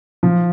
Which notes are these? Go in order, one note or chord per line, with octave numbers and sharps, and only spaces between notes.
F3